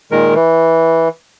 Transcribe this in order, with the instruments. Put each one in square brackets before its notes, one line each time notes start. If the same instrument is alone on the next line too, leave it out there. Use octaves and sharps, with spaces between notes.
[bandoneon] A#2 D#3 G#3 A#4
E3